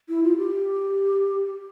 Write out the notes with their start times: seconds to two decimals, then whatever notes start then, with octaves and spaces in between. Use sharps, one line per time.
0.09 E4
0.23 F4
0.37 G4